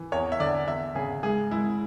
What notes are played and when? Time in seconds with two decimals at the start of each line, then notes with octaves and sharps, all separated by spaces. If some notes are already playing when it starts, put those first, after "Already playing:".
Already playing: E3
0.12 E2 C#5
0.32 E5
0.40 D3 D5
0.67 E2 E5
0.95 C#3 G#4
1.23 G#2 G#4
1.51 G#3 E4